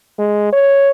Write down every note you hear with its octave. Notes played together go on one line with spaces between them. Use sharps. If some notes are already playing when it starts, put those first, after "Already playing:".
G#3
C#5